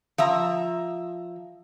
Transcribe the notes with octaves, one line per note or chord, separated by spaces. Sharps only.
F3 E5 A#5